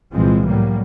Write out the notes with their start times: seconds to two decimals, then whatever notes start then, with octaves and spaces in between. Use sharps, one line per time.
0.12 C2 A#2 E3 F3 G#3 C4
0.46 A2 F#3 G3 A#3